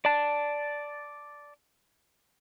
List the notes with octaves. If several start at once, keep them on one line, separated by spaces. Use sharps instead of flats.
D5 A5